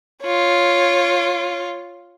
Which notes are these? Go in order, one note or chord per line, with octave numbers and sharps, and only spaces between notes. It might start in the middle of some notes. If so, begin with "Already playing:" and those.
F4 C#5